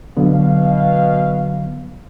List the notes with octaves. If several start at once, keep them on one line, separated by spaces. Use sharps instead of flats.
B2 D3 F#3 B3 F5